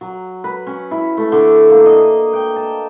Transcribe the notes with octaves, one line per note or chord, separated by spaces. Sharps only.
F#3
B4
C#4
E4
A3
D3
A#3
D#5
G5
A5